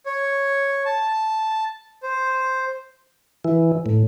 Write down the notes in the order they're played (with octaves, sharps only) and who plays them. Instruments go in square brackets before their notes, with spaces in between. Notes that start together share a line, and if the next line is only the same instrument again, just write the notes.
[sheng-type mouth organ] C#5
A5
C5
[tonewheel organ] E3
A2